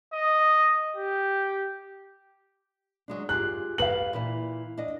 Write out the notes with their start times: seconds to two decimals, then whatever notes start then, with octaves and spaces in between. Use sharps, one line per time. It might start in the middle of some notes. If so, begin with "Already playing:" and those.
0.13 D#5
0.96 G4
3.08 F#3 G#3 D4
3.29 F4 G4 G#4 F#6
3.78 G4 A4 B4 F5 F#7
4.13 A#2 E3 E4
4.77 D4 D#5